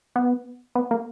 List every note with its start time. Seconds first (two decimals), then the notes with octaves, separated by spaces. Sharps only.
0.16 B3
0.75 B3
0.91 A#3